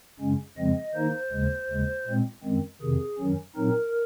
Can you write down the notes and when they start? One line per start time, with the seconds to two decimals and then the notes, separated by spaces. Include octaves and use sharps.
0.20 F#2 C#3 G#3 C#4
0.57 F2 C#3 F3 G#3 C4 D#5
0.94 D#3 A#3 D#4 C5
1.32 D#2 C#3 G#3
1.69 D#2 C#3 G#3
2.07 A#2 G#3 C4
2.44 F#2 D#3 G#3 C4
2.81 F2 C3 D#3 G#4
3.19 F#2 D#3 F#3 C#4
3.56 A#2 F#3 C4 D#4 A#4